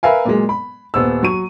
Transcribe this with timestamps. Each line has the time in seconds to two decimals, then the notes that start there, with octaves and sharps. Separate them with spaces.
0.03 A#4 B4 E5 F5 G#5
0.25 A#2 F#3 G#3
0.49 B5
0.94 D#1 B3 C5 E6
1.23 F#3 C#6 D#7